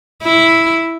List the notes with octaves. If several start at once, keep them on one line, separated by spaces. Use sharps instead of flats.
E4